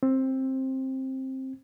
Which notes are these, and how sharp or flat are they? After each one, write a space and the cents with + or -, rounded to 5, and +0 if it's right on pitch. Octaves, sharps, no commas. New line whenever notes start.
C4 +15